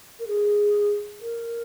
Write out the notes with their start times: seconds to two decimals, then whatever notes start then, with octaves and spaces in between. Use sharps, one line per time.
0.20 A#4
0.27 G#4
1.21 A#4